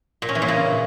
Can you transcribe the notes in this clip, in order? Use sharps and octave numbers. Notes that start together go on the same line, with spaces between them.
A#2
C#4
E3
A#2
C#3